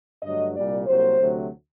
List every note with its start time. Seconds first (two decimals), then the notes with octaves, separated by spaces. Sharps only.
0.23 G2 D3 F#3 A3 D#5
0.54 C2 A#2 G3 D5
0.87 C2 C3 F#3 A#3 C5
1.18 D2 C3 F#3 A3